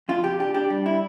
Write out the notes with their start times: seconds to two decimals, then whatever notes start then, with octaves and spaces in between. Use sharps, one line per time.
0.09 F2 F4
0.24 C3 G4
0.39 D4 G4
0.54 D4 G4
0.70 G3
0.86 E4